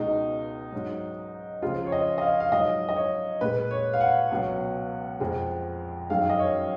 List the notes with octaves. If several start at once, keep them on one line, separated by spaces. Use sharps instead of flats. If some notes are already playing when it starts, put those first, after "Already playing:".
Already playing: C#2 B2 G#3 D#4
G#2 F#3
C#2 C#3 F3 F4
C#5
D#5
D#5
F5
F5
G#2 F#3 D#5
D#5
C#5
A#2 G#3 B4
C#5
F5
F#5
C#2 B2 F#3
F2 F3 G#3
F#2 D#3 G#3 F5
D#5
C#5